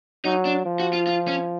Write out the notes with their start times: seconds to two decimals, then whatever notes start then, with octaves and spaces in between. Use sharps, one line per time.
0.25 F#3 D#4
0.45 D4
0.66 F3
0.80 F#4
0.93 F4
1.07 F4
1.28 C#4